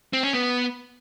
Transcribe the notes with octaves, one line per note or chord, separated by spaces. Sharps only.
C4
C#4
B3